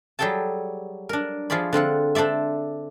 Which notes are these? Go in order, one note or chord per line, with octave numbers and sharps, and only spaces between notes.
F#3 G3 G#4 A4 G5 A5
D4 A#4
F3 F4 G#4 D5 B5
D3 C4 F4 F#5
D4 A4 C5 D5 E5